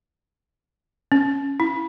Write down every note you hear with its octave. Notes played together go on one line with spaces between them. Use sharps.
C#4
E4